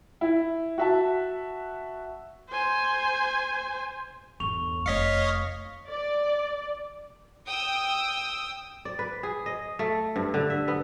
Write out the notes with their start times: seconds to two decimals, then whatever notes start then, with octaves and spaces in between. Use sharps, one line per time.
0.21 E4
0.78 F#4 E5 A5
2.49 C5 G#5
4.40 G1 E2 C#6 F7
4.86 F1 C#5 D#5 F5 B6 C#7
5.87 D5
7.46 G5 D#6 E6
8.85 D5
8.99 B4
9.23 G#4
9.46 D#5
9.79 A3
10.16 G2
10.34 D3
10.50 E5
10.68 B3